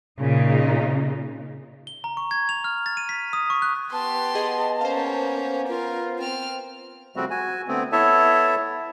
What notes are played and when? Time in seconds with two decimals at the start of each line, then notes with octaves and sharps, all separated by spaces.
0.20 A#2 C#3 D#4
1.87 G7
2.04 A#5
2.17 C#6
2.31 G#6
2.49 F7
2.64 F6
2.86 A6
2.97 D#7
3.09 B6
3.33 D#6
3.50 C#6
3.62 F#6
3.93 B3 G4 A5 C6
4.35 G#4 D#5 F#5
4.81 A#3 C#4 C5 F5
5.69 F4 A#4
6.19 C4 F6
7.16 C#3 F3 G3 A3 C4 F#4
7.30 F#4 G#5
7.68 D3 A3 B3 C4
7.92 B3 E4 A4 C#5 E5 A5